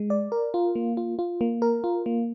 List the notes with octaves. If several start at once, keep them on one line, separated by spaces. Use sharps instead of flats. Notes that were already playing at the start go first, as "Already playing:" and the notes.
Already playing: G#3
D5
A#4
F4
A#3
F4
F4
A#3
A#4
F4
A#3